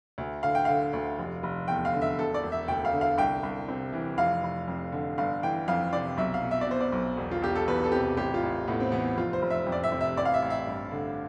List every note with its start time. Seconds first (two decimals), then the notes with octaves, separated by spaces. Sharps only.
0.18 D2
0.43 D3 F5
0.55 G5
0.65 D3 F5
0.93 D2
1.19 F1
1.43 F1
1.68 E2 G5
1.85 F5
1.93 D3
2.02 E5
2.18 E1 A4
2.34 D5
2.43 E1
2.52 E5
2.68 D2 G5
2.85 F5
2.93 D3
3.01 F5
3.18 C2 G5
3.43 C2
3.68 C3
3.93 E3
4.18 F1 F5
4.43 F1
4.68 F2
4.92 D3
5.18 G1 F5
5.43 E3 G5
5.68 F2 F5
5.93 C3 D5
6.17 B1 E5
6.34 F5
6.42 B2
6.51 E5
6.61 D5
6.67 B2 C5
6.81 D5
6.92 B1
7.17 E1
7.31 F4
7.42 E1 G4
7.56 A4
7.67 E2 B4
7.84 A4
7.92 C3 G4
8.17 A1 G4
8.34 F4
8.43 A1
8.68 A2 B3
8.80 C4
8.92 E3 B3
9.17 F1 F4
9.33 C5
9.42 F1
9.50 E5
9.67 F2
9.72 D5
9.84 E5
9.92 C3
10.01 E5
10.16 A1 D5
10.25 F5
10.34 E5
10.42 A1
10.50 E5
10.67 G2
10.91 D3